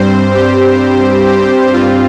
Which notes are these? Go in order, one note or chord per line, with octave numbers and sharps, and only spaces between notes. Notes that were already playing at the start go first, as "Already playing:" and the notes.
Already playing: G2 G3 C4 C5
G4
G4
G2 G3 C4 F4